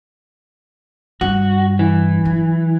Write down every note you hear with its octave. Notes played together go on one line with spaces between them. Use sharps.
G2 F#4
E3
F#3